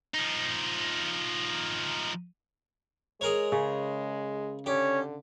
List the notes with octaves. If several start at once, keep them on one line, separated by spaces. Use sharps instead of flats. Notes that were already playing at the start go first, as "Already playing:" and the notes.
F3 D#4
G#3 G#4 A#4 C#5
C#3
D3 C#4 G4 C#5